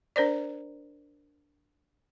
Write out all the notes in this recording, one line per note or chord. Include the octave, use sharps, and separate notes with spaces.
D4 A#4 C5 D5